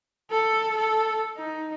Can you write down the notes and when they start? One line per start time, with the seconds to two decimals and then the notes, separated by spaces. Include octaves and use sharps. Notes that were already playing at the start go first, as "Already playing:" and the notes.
0.30 A4
0.77 A4
1.37 D#4